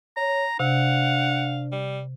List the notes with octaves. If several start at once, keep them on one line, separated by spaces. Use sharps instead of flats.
C#5 A#5
C3 D4 F5 F#5
G3